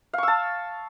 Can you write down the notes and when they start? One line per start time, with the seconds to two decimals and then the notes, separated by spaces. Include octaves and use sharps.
0.13 F5
0.18 C#6
0.23 E6
0.28 A5